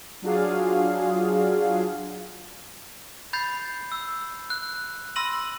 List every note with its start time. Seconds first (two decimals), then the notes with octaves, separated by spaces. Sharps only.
0.22 F#3 D4 F4 F#4 G#4 F5
3.33 B5 G6 A6 C7
3.92 E6
4.50 F#6
5.16 B5 C6 E6 A#6 D#7 F#7